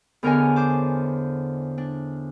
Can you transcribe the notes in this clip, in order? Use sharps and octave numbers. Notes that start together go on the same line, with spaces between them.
E2 D3 A#4 C#5 D#5 G#5
C5 D6
D4